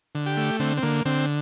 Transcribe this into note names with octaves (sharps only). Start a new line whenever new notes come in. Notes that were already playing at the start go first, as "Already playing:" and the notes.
D3
G4
A3
D3 C4
C4
D3 A#3
D3 C4